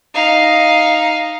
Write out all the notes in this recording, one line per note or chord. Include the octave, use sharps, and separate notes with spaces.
D#4 F5